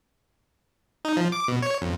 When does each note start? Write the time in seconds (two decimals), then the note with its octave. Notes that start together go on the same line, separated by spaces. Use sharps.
1.05 D#4
1.17 F3
1.32 D6
1.48 B2
1.62 C#5
1.81 F2